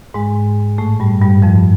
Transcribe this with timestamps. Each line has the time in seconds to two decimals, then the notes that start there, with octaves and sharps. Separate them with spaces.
0.14 G#2 G#3
0.78 A2 A3
1.00 G2 G3
1.21 G2 G3
1.42 F2 F3